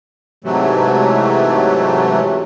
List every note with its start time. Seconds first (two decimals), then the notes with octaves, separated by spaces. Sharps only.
0.44 G#2 C3 E3 F#3 A3